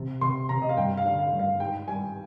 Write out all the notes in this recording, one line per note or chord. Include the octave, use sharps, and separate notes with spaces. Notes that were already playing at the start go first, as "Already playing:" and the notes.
Already playing: C3
C3 C6
C3 A#5
D#5
F5
G2 G5
F5
D3
F5
G2
F5
G#2 G5
G3 G#5